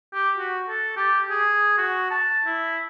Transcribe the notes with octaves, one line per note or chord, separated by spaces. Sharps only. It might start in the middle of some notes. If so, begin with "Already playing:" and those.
G4
F#4
A4
G4
G#4
F#4
A5
E4